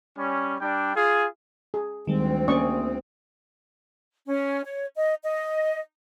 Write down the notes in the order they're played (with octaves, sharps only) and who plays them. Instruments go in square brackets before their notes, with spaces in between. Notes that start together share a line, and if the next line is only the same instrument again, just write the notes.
[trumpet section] G3 C#4
G3 D4 G5
F4 G#4
[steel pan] G#4
[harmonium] D2 C4 [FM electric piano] D#3 G3 G#3
[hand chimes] A#3 D#6 [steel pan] C#4 D5 C#6
[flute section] C#4
C#5
D#5
D#5